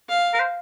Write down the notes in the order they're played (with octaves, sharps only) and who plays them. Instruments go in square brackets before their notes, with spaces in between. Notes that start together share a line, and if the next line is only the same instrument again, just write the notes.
[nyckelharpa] F5
[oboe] A#4
C5